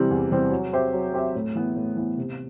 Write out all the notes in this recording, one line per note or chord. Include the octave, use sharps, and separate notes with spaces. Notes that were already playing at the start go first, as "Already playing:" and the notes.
Already playing: C3 E3 G3 C4
E2
C3 E3 G3 C4
F#3
C4 G4 C5 E5
F#3
C4 G4 C5 E5
A2
E3 B3
A2
E3 B3
C3